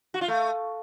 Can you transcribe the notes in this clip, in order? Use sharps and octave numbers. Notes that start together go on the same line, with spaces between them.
F#4
F4
A3